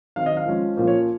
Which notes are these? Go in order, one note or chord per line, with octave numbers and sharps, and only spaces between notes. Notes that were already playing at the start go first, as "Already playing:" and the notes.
D#3 F#3 C4 F5
D#5
F5
F3 G#3 C#4
A#2 F3 A#3 C#4 C5
C#5